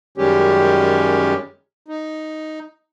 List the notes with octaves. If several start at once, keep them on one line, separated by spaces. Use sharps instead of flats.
F#2 D#3 G3 G#3 C#4 G4
D#4